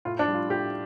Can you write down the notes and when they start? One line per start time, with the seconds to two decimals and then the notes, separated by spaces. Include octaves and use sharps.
0.05 A2 F4
0.19 D4
0.28 G3
0.34 F4
0.49 A2 G4